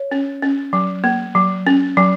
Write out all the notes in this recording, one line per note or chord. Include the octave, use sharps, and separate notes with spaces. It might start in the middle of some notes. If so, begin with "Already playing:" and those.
Already playing: C#5
C#4
C#4
F#3
A#3
F#3
C#4
F#3